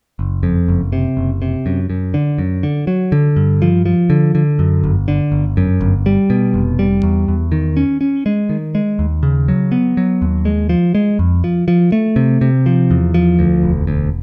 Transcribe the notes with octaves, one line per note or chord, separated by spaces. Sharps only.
F#1
F2
F#1
C3
F#1
C3
F#2
F#2
D3
F#2
D3
F#3
D3
G2
F3
F3
D3
D3
F#2
G1
D3
G1
F#2
G1
G3
B2
F1
G3
E2
E2
D#3
C#4
C#4
G#3
D#3
G#3
D#2
C#3
F#3
B3
F#3
D#2
G#3
F3
G#3
F2
F3
F3
A3
C3
C3
F3
E2
F3
D2
E1
D2